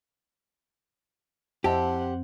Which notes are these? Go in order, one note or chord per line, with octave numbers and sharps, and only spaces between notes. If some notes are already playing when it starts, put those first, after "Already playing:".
F2 C4 E4 G4 C5 D#5 F#5 A5